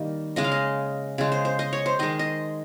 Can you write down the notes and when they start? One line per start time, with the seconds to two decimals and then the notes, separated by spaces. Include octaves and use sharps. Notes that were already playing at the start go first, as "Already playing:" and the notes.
Already playing: D#3 G3 A#3
0.36 C#3 G#3 D#5
0.44 F5
0.52 D#5
1.18 C#3 G#3
1.32 C5
1.45 C5
1.59 D#5
1.73 C#5
1.86 C5
1.99 D#3 G#3 D#5
2.19 D#5